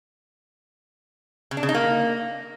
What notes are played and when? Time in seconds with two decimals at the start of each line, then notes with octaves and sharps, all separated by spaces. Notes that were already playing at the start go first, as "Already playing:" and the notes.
1.51 C#3
1.57 D4
1.63 C#3
1.69 D#4
1.75 A#3